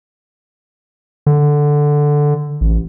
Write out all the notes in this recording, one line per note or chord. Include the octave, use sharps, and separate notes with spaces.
D3
A1